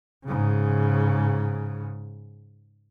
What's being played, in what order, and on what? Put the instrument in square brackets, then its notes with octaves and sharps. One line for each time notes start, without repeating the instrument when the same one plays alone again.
[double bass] G#2 C#3